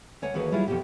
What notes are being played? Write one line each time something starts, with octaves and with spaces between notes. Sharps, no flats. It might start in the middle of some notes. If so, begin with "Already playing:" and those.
D2 C#5 F#5 G#5
D#2 D3 E3 F#4 G#4 F5
F#3 G3 E4 F4 G#4
F2 B2 G4